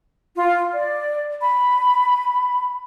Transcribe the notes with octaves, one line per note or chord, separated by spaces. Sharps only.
F4
D5
B5